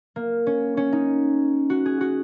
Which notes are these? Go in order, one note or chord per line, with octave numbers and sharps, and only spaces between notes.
A#3
C#4
C#4
D#4
F#4
G#4
F#4